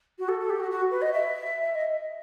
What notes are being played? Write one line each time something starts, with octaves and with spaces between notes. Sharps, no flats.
F#4
A4
A4
G4
F#4
F#4
B4
D#5
E5
D#5